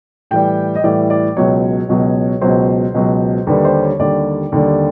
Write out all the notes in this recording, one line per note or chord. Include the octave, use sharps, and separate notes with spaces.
A2 E3 G3 G5
D#5
A2 E3 G3 D5
D5
C#2 B2 F#3 C#5
C#2 B2 F#3
C#2 B2 F#3 C5
C#2 B2 F#3
D#2 D3 G3 B4
C5
C#5
D#2 D3 G3 D5
D#2 D3 G3